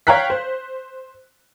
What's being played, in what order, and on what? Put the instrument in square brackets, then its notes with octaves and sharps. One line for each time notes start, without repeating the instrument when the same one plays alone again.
[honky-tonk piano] C#5 F5 G5 A#5 F#6 B6
C5